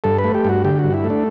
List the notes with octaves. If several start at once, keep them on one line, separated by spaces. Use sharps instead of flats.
G2 A4
B4
A3
G4
G2 F#4
D3 G4
G2 F#4
E4
A3
D4